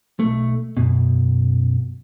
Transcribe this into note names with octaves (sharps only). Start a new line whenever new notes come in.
B1 A3
F#2 B2